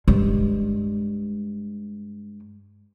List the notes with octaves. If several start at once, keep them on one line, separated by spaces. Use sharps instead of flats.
G2 G#3